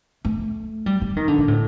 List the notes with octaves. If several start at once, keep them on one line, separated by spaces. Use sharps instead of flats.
A3
G3
G3
D#3
D3
A#2
A2